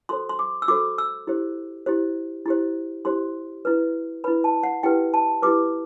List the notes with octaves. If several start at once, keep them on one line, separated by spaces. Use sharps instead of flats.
F#4 A4 C5 C6
C6
D6
E6
F#4 A4 C5 D6
E6
E4 G4 C5
E4 G4 C5
E4 G4 C5
E4 G4 C5 C6
E4 B4
E4 B4 B5
A5
F#5
E4 G4 B4 G5
A5
E4 G4 B4 D6